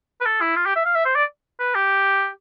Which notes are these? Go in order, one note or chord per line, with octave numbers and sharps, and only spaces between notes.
B4
A4
E4
F4
G4
E5
F5
E5
C5
D5
B4
G4